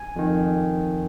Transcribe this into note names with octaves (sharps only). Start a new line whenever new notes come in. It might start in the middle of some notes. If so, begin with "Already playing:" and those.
Already playing: G#5
F2 D#3